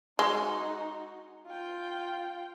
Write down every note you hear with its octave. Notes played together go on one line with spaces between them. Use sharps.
G#3 D#4 F#4
F4 G5